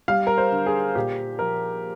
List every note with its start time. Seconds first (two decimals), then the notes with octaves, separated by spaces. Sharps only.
0.08 G3 F5
0.27 A#4
0.38 C5
0.52 D3
0.66 G#4
0.95 A#2 G4
1.39 F3 A#4